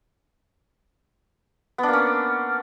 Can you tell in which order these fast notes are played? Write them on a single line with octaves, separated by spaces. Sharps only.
B3 D4 A#3 C#4